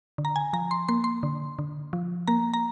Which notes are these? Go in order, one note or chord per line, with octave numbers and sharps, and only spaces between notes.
D3
A#5
G#5
F3 A#5
C6
A#3 C6
C6
D3
D3
F3
A#3 A#5
A#5